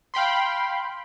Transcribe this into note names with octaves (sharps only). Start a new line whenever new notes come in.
F5 G5 B5 C6